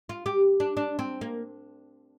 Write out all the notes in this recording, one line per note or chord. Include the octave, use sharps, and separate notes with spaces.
F4
G4
D4
D4
C4
A#3